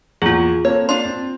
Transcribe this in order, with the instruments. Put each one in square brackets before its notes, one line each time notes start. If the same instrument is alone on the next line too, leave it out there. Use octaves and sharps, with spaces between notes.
[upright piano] E2 A#2 [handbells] F4 G#4
[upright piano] A#3 C4 A4 [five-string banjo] C#5
[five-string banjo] D4 F4 [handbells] C6
[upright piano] C4